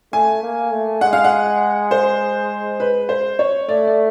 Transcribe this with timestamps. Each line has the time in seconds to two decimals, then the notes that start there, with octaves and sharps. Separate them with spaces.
0.13 A3 G#5
0.43 A#3
0.72 A3
1.01 G#3 F#5
1.13 F5
1.24 F#5
1.91 C5
2.80 B4
3.09 C5
3.39 C#5
3.69 A3 D5
3.87 D5